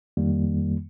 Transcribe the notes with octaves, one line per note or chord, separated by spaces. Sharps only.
F2 D#3 G3 A#3